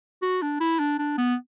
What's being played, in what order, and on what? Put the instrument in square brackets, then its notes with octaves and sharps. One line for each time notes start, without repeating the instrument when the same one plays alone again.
[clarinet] F#4
D4
E4
D4
D4
B3